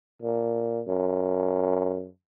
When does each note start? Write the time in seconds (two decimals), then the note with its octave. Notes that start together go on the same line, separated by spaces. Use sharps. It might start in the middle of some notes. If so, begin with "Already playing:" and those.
0.22 A#2
0.88 F#2